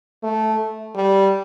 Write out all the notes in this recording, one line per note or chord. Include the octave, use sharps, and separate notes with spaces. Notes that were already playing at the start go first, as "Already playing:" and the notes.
A3
G3